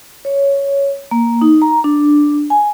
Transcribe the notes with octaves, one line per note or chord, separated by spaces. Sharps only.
C#5
A#3
D#4
A#5
D4
G#5